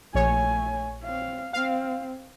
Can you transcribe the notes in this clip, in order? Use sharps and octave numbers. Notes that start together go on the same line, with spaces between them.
A#1 A3 C#5 G#5
C4 F5
C4 F5